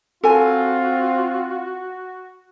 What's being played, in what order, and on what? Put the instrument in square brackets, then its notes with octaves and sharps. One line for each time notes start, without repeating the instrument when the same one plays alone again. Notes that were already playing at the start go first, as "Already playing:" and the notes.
[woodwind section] C4 [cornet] F4 [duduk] F#4 [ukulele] A4 G#5